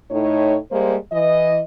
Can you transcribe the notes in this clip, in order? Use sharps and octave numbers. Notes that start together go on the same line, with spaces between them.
A2 D#4 C#5
G3 G#3 A#3 C5
E3 D#5